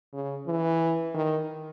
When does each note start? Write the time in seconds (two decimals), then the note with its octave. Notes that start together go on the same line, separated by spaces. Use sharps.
0.13 C#3
0.47 E3
1.15 D#3